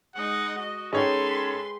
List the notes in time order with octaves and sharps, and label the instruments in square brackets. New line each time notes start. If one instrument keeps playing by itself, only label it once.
[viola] G#3 D#4 [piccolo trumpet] F#5
[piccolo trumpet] F#4 [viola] D#5
[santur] G#3 G5 [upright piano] C#4 D#4 C#5 [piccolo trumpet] A4 [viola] B4 C6